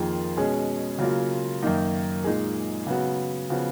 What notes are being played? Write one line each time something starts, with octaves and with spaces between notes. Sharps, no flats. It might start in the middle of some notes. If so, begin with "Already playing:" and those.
Already playing: F2 D#3 A#3 F4 G#4
B2 G#3 C#4 G#4
C#3 F#3 A#3 F4
F#2 D#3 A#3 D#4
A#2 G#3 D#4 G#4
C#3 F#3 B3 F#4
C#3 F3 B3 F#4